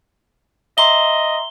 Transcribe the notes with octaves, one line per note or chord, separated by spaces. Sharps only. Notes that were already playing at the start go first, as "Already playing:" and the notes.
D#5 E5 A#5 C6 G7